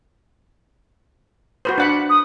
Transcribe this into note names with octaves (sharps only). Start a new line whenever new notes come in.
F#4 B4 C5
D4 F#5 B5
D#6